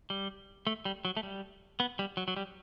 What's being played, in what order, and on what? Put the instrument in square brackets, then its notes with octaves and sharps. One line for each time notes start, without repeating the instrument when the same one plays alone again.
[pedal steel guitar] G3
A3
G3
F#3
A3
G3
B3
G3
F#3
F#3
G3